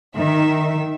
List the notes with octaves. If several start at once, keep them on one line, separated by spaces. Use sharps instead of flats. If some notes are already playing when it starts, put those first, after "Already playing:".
D#3 E5